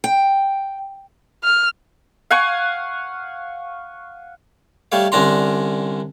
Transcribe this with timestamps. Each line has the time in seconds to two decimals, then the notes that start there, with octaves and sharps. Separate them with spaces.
0.04 G5
1.44 F6
2.30 F5 F#5 G#5 C#6
4.92 G3 A3 C#5 F5
5.12 C2 D3 C#4 D4 A#5 C6